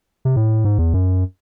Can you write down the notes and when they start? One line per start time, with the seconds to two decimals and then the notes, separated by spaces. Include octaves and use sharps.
0.25 C3
0.36 A2
0.65 G#2
0.78 E2
0.94 F#2